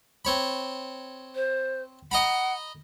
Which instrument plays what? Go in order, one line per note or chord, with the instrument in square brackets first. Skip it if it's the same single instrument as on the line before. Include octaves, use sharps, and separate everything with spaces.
[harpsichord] C4 C#5 B5
[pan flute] C5
[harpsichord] D#5 A#5 B5 [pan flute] F#5